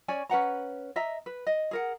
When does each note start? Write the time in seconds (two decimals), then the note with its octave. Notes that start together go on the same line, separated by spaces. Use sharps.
0.08 C#4 C#5 D5 G#5
0.29 C#4 B4 F#5 A#5
0.96 D#5 E5 A#5
1.26 B4
1.47 D#5
1.71 G#4 A#4 F#5